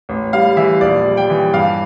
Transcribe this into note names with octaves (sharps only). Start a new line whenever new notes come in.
A1
G3 F5
E3 E5
A#1 D5
G3
G5
E3
G2 F5